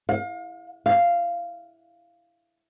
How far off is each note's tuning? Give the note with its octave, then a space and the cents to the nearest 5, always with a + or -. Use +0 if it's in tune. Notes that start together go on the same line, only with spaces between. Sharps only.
F5 +35
F5 -10